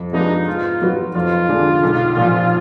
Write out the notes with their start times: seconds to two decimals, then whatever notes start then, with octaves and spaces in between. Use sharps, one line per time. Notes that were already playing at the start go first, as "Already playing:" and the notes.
Already playing: F2
0.13 F3 G#3 B3 D4 D#4
0.47 G#2 F4
0.81 F#3 B3 D#4 F#4
1.14 F2 F4
1.49 D3 G#3 D4
1.83 B1
2.17 A#2 F3